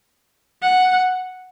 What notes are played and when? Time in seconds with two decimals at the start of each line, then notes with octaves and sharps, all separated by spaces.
0.62 F#5